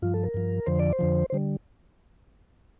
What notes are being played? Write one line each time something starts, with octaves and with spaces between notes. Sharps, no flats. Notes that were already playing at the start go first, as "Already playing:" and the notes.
G2 F3 F4
A4
A#4
G2 F3
F2 D3 F3 C5
D5
C5
F2 D3 F3
C5
D3 G3